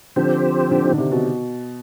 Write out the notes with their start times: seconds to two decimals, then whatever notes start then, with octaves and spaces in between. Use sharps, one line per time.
0.16 D3 F3 C4 G4 C5
0.71 D3
0.84 D#3
0.93 D3
0.98 C3
1.11 B2